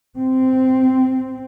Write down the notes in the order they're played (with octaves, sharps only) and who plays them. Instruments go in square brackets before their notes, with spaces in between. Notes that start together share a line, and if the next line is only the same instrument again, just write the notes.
[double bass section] C4